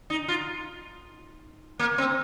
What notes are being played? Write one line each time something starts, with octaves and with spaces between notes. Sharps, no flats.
D#4
F4
A#3
C4